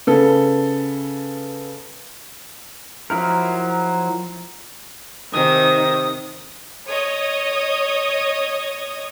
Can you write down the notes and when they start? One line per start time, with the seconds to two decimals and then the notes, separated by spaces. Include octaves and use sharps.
0.07 C#3 B3 A4
3.10 F3 F#3 E4 A#4
5.33 C3 D#3 G#5 D#6
6.86 C#5 D#5 D#6